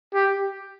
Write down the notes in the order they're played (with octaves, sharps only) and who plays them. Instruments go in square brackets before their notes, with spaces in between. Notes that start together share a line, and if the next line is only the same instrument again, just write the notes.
[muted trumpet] G4